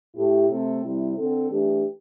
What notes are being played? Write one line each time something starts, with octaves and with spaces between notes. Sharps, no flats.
A2 A3 E4 G4
C3 A3 C4 A4
C3 G3 C4 E4
D3 C4 A4
E3 A3 D4 G4